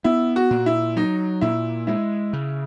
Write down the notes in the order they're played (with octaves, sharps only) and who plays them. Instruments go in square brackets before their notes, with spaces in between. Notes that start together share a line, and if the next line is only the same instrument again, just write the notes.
[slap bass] B3 [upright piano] E4
[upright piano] F#4
[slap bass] A#2
[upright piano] E4
[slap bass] F#3 [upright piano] D#4
[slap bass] A#2 [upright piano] E4
[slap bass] G#3 [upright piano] E4
[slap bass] C#3